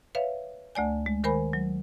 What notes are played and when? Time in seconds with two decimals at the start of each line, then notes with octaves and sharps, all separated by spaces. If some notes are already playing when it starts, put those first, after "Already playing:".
0.15 B4 C#5 E5 F5
0.75 D2 A3 D5 G#5
1.06 G#3
1.24 D#3 A#4 C5 G#5 B5
1.53 F#3